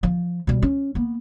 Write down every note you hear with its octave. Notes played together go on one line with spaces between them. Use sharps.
F3
B2 G3
C#4
A#3 B3